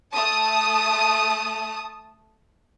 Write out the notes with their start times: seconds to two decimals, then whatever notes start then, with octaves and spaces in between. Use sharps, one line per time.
0.14 A3 A5 D#6